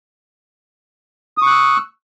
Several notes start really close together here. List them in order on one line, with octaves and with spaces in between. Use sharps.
D#6 C#6 F#6 E6